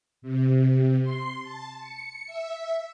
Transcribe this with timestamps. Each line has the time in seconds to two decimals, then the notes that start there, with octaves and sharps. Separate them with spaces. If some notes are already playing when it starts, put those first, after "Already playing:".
0.22 C3
1.02 C6
1.43 A5
1.79 C#7
2.27 E5